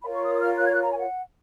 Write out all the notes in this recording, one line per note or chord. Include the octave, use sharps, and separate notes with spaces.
F4 A#4 C#5 B5
C#6
D#6
D#6
F6
F#6
G#6
F#6
A#5
G#5
F#5